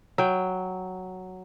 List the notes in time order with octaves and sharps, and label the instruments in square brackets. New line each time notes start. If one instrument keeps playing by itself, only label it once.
[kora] F#3 G5